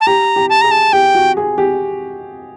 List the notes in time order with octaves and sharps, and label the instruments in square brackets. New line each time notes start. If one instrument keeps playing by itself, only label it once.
[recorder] A5
[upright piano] G4 [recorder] A#5
[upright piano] G4
[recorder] A5
[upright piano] G#4 [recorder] A#5
[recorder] A5
[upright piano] G4 [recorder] G5
[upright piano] F#4
G#4
G4